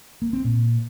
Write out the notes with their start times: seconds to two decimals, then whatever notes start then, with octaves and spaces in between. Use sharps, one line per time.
0.22 A#3
0.33 C4
0.45 A#2